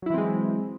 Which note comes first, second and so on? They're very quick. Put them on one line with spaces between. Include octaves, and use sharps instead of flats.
F#3 E4 E3 C4 G#3